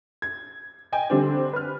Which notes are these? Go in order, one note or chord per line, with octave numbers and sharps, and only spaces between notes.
G#6
D#5 G5 G#5
D3 G3 C4 D4
B4 F6